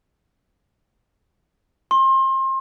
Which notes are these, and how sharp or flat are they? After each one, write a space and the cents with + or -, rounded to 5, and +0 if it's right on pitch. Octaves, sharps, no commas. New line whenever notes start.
C6 +30